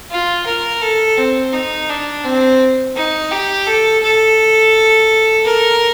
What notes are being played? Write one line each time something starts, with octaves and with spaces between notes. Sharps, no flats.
F4
A#4
A4
C4
D#4
D4
C4
D#4
G4
A4
A4
A#4